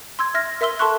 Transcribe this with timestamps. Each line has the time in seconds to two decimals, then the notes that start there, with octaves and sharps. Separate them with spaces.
0.19 C6 E6 G#6
0.34 E5 F6 A#6
0.61 A#4 E5 C6 E6 G7
0.79 A4 A5 C6 C#6 F#6